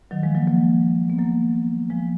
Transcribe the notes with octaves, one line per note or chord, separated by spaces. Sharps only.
D#3 F#3
F3 G#3
F#3 A#3
F#3 A#3
B3
F#3 A#3
F3 G#3